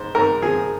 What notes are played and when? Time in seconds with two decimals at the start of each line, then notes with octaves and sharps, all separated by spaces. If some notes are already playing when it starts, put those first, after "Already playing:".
Already playing: G#2 C5
0.15 G#2 A#4
0.42 F3 G#4